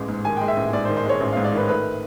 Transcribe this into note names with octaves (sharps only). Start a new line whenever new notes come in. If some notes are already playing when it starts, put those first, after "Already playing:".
Already playing: A1 G#3
G#2
D#3 G#5
G5
G#3
E5
A1
G#2 D5
C5
D#3
C5
G#3 C#5
A1
F5
G#2
D5
D#3 B4
A3 B4